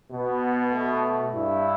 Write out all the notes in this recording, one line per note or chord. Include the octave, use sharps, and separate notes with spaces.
B2 B3
A3
G2 E4